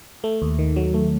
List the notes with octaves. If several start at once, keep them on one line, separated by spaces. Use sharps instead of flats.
A3
D#2
D#3
F#3
A3